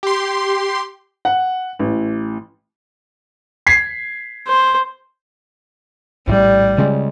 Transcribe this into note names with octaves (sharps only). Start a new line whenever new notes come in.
G4 C6
F#5
A1
G#6 B6 C7
C5
A#1 A2 G3
C#3 G#3 C#4